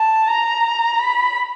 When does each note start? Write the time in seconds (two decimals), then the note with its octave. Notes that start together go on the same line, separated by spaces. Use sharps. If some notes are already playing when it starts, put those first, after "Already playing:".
Already playing: A5
0.27 A#5
0.99 B5